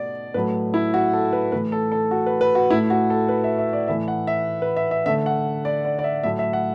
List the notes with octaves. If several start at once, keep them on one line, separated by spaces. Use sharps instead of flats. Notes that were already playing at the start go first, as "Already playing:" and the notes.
Already playing: B2 A3 D5
A2 F#3 A3 B4
E4
F#4
A4
B4
A2 E3 A3 B4
A4
A4
F#4
B4
B4
F#4
A2 A3 E4
F#4
A4
B4
E5
E5
D5
A2 E3 A3 E5
F#5
E5
B4
E5
E5
D3 A3 E5
F#5
D5
D5
D5
E5
A2 F#3 A3 E5
E5
F#5